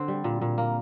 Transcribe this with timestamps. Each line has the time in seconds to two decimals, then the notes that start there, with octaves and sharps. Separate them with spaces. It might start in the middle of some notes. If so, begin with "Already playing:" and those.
Already playing: D3 C4 C5
0.08 G3
0.24 A#2
0.41 A#2
0.58 A#3